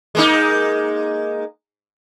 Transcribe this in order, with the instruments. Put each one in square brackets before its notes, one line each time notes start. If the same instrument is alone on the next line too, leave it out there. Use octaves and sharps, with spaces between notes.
[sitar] G#3 A#3 D#4